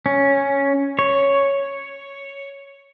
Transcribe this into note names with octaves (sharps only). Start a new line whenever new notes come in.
C#4
C#5